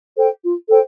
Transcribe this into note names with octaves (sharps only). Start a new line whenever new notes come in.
A4 C5 G5
F4
A4 C5 G5